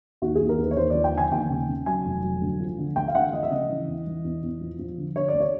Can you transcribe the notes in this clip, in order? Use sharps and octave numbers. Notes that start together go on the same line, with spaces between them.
D#2 F#4
G#4
D#2
A#4
D#2 B4
C#5
D#2 C5
D5
F3
G5
D3 G#5
D#2 G5
C#3
C#3
F#3 G#5
F1
F#3
D2
F3
D3
D2 G5
F5
D2 F#5
F3 D#5
E5
C#3 D#5
E3
E2
E3
E2
E2
F3
F3
D3
D3 C#5
D5
D2
C#5